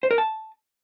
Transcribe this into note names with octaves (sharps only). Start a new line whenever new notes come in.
C5
A#4
A5